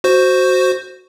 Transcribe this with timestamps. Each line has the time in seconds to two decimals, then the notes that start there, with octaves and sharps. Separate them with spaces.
0.04 F#4 C5